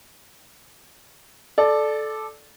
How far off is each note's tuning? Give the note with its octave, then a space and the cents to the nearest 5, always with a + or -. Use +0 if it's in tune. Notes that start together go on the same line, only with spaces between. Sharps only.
A4 -15 D5 +10